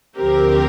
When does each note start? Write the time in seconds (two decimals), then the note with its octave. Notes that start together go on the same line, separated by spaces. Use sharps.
0.16 D2 D3 F3 C4 G4 A#4